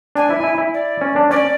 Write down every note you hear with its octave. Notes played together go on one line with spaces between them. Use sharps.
D4 G#5
E4
E4
E4
D5
C#4
D4
C#4 D5